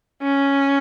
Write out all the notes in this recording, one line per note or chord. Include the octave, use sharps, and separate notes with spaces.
C#4